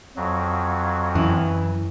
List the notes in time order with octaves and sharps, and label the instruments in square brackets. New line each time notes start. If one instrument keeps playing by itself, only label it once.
[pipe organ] F2 F#3
[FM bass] F#2 [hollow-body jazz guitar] E3